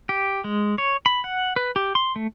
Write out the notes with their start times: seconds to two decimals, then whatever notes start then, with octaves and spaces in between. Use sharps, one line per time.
0.09 G4
0.44 G#3
0.78 C#5
1.06 B5
1.24 F#5
1.56 B4
1.76 G4
1.95 C6
2.16 A3